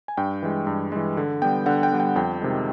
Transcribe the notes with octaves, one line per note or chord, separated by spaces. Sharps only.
G#5
G2 G5
E3 G#3
G2
E3 G#3
D3
G3 B3 G5
D3 F#5
G5
G3 B3
G5
F2 G5
C3 D#3 G#3